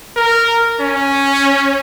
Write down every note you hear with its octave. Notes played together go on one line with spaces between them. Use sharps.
A#4
C#4